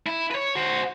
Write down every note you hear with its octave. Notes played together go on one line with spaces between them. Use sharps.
E4
B4 C#5
F#4 C5